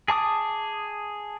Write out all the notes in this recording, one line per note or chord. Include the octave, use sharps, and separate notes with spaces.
G#4 A5 D6 D#6